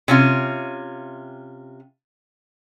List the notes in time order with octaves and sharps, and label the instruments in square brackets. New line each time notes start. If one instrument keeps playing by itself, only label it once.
[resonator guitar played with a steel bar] C3 C#4 F4